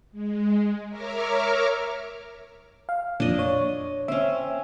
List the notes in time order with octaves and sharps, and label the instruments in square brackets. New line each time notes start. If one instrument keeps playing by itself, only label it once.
[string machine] G#3
A#4 C#5 E5 A#5 D6 F6
[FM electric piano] F5
[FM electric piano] F2 A#2 [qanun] D4 D#5
[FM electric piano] C#5
[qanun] C4 C#4 [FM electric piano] E5